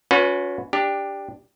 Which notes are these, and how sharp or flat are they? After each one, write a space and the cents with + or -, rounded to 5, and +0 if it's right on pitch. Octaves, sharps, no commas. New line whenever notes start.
C#4 +20 F#4 -40 B4 +0
D4 +0 G4 +10